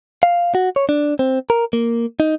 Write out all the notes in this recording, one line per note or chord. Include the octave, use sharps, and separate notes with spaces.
F5
F#4
C#5
D4
C4
A#4
A#3
D#4